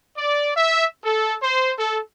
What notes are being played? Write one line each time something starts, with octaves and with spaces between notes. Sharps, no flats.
D5
E5
A4
C5
A4